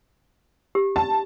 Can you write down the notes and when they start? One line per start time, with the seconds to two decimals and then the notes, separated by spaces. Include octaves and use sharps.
0.75 G4
0.96 A5